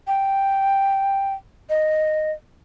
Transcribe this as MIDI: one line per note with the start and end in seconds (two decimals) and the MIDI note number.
0.07 1.34 79
1.70 2.32 75